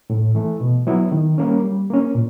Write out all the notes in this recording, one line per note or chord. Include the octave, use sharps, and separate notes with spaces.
A2
E3 A3
B2
F#3 B3 E4
D#3
G3 A#3 C#4
G3
A#3 C#4
A#2